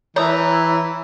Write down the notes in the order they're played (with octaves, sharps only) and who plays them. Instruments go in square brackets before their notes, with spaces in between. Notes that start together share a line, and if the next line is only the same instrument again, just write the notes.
[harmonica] E3 [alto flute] E4 [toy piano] C#5 D#6 [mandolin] A#5